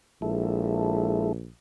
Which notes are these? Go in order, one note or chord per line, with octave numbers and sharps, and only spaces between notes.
A#1 G#3 E4 A4